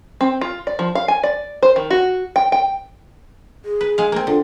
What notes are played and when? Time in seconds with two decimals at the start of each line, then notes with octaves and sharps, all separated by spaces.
0.21 C4
0.41 F4
0.67 D5
0.79 F3
0.95 F5
1.08 G#5
1.23 D5
1.62 C5
1.76 D#3
1.90 F#4
2.36 G5
2.52 G5
3.65 G#4
3.81 B4
3.98 G#3 F5
4.12 A#3 C4
4.27 D3 F4